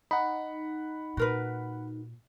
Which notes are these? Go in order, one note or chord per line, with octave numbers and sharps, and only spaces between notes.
D#4 F#5 B5
A#2 F#4 A#4 B4